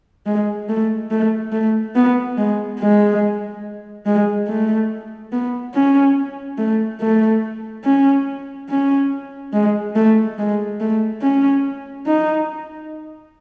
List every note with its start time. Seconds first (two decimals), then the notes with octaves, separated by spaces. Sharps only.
0.26 G#3
0.68 A3
1.11 A3
1.52 A3
1.95 B3
2.37 G#3
2.79 G#3
4.06 G#3
4.48 A3
5.32 B3
5.74 C#4
6.58 A3
7.01 A3
7.84 C#4
8.69 C#4
9.53 G#3
9.96 A3
10.38 G#3
10.80 A3
11.22 C#4
12.06 D#4